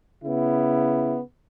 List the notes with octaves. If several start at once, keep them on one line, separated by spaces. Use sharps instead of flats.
C#3 B3 E4